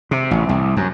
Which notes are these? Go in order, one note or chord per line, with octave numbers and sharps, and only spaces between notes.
C3
A1
C2
F#2